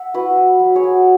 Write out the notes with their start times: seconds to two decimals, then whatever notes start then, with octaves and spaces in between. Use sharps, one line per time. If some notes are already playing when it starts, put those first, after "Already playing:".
Already playing: E5 F#5
0.14 E4 F#4 B4
0.37 E4
0.60 F#3
0.76 G#4 C#5
0.84 F#3